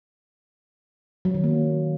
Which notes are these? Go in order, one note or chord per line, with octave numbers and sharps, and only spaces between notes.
F#3
D#3
A#3